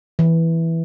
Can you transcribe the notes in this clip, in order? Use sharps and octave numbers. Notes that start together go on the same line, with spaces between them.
E3